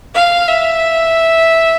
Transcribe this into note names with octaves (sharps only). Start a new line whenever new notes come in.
F5
E5